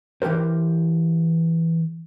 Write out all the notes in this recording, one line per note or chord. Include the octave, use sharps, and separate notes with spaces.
E3 G4 A4 A#4 C5